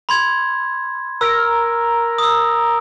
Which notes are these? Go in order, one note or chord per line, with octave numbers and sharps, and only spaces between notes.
B5 C6 G#6
A#4 E6
D#6 E6